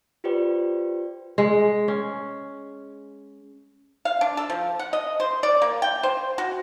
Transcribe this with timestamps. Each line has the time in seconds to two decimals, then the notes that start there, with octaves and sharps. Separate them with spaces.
0.24 F4 G4 B4 C5 D5 G5
1.38 G#3
1.88 C#4
4.05 F5
4.21 D4
4.37 A4
4.50 F3
4.79 F#5
4.93 D#5
5.20 C5
5.43 D5
5.62 A#3
5.82 G5
6.03 C5
6.38 F#4